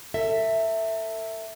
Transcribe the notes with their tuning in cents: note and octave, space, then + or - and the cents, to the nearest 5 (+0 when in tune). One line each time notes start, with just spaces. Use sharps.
A4 +40 E5 +0